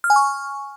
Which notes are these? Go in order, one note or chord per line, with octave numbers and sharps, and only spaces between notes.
F6
G#5
C#6